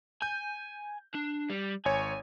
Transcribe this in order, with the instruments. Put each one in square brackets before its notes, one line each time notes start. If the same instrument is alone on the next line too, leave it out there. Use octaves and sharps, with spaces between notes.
[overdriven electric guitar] G#5 [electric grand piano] G6
[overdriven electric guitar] D4
G3
[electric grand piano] G#1 C#5 [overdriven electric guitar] G#5